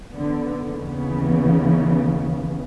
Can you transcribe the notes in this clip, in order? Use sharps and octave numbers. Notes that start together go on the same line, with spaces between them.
D3 B3
D#2 C#3 E3 B3